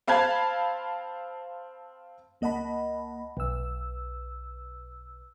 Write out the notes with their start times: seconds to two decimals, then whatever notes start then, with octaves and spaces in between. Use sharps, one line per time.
0.08 C4 F5 A5 B5 G#6
2.41 C#2 A#3 D#5 F#5 A5 B5
3.37 B1 E6